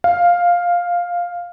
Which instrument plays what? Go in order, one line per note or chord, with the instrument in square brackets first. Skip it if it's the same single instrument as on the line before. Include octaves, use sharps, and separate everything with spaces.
[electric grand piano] F5